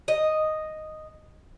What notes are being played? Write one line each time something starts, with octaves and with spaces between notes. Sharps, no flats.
D#5